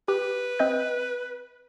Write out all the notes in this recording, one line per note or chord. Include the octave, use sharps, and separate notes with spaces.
G4 B4
C4 D#5 G6